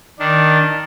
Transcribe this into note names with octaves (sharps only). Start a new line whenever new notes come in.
D#3 D4